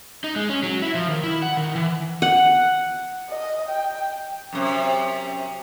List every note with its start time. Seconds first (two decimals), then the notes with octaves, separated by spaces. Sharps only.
0.24 D#4
0.36 G#3
0.50 C#4
0.63 F#3
0.82 E4
0.95 F3
1.09 D#3
1.24 E4
1.42 F#5
1.57 D#3
1.76 E3
2.22 F#5
3.30 D#5
3.69 G5
4.53 F#2 C3